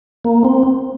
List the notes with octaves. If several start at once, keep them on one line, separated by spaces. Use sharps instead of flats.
A#3
C4